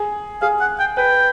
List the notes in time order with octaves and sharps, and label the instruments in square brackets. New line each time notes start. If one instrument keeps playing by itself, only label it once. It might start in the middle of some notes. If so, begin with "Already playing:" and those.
Already playing: [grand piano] G#4
[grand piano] G#4 [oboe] F5
[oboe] F#5
G5
[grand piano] B4 [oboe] G5